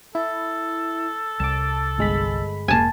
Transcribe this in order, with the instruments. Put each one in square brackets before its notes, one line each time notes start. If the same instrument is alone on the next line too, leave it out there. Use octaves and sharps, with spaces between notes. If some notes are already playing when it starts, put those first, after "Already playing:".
[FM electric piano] E4 [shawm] A4
[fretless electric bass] C2 [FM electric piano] A5 D6
[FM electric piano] G1 G#3 B5
[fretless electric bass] E1 A#3 [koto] G#5 A5